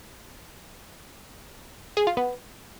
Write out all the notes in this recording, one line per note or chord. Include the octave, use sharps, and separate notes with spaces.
G#4
F4
B3